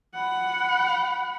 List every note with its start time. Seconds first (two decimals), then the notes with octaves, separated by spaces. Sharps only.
0.14 F#5 B5